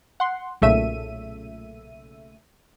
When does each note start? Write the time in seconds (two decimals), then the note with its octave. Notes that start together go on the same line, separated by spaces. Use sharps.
0.20 F#5 C6
0.62 B1 A#2 C#3 A3 E5 D#7